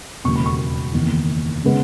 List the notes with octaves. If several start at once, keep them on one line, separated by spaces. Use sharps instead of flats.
E1 D#2 C#3 F#3 C#6
B5
C#6
F#1 E2 D#3
C#3 G#3 B3